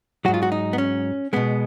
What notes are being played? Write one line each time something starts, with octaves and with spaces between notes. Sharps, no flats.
G#2 F#3 F#4
F4
F#4
D#4
B3
C#4
B2 G#3 B3